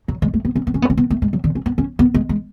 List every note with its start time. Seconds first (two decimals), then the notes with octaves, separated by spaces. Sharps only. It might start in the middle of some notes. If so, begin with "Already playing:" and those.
0.08 F#3
0.22 G#3
0.34 A3
0.45 B3
0.56 C#4
0.67 B3
0.74 C#4
0.82 B3
0.90 C#4
0.97 B3
1.10 A3
1.22 G#3
1.33 F#3
1.44 D3
1.55 C#4
1.66 B3
1.78 C#4
1.99 B3
2.14 G#3
2.29 G#3